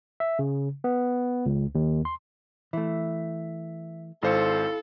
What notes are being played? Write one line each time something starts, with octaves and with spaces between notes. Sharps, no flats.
E5
C#3
B3
C#2
D#2
C6
E3 A3 E5
G#1 E4 A4 C5 F5 C6 C#7